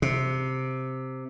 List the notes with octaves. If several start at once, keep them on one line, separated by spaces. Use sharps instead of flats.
C3